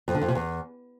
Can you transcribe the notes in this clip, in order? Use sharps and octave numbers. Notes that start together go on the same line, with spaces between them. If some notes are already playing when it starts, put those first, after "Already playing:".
F2
D3
F2
C3
E2